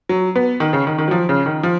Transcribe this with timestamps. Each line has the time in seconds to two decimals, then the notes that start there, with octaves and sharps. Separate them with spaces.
0.09 F#3
0.35 B3
0.60 D#3
0.73 C#3
0.87 D#3
0.98 D#3
1.08 F#3
1.11 F3
1.29 C#3
1.46 D#3
1.63 F3